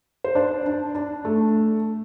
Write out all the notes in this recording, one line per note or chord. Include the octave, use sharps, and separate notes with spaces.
C5
D4 D5
D4
D4
A3